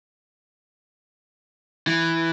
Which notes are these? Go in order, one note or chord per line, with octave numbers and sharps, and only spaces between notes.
E3